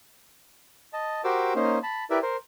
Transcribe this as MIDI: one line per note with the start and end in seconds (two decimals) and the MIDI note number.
0.93 1.21 75
0.93 1.21 81
1.24 1.53 66
1.24 1.53 67
1.24 1.53 70
1.24 1.53 72
1.24 1.53 86
1.24 1.53 88
1.55 1.79 58
1.55 1.79 61
1.55 1.79 63
1.55 1.79 72
1.83 2.04 81
1.83 2.04 83
2.10 2.19 64
2.10 2.19 67
2.10 2.19 70
2.10 2.19 71
2.10 2.19 74
2.10 2.19 76
2.22 2.37 70
2.22 2.37 72